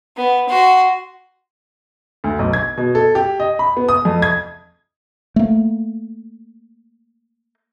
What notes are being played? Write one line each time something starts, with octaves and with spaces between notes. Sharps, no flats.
B3
F#4 C6
D2
B1
G#6
B2
A4
G4
D#5
B5
B3
D#6
F2
G#6
A3 A#3